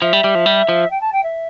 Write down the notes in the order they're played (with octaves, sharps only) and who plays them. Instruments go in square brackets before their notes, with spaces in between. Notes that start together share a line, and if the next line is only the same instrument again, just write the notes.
[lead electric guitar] F3 [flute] E5
[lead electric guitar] G3
G3
F3
G3
F3
[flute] G5
A5
G5
E5